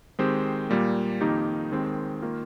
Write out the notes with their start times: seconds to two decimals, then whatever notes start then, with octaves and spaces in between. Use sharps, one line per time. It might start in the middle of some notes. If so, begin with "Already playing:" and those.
0.19 D#3 G#3 C4 G4 C5
0.70 A#2 G3 A#3
1.21 F2 D#3 A#3 D#4 G4
1.72 D#2 D#3 G#3 C4
2.22 D#3 A#3 F4